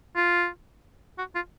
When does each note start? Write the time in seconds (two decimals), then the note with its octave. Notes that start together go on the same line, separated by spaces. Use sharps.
0.16 F4
1.18 F#4
1.35 F4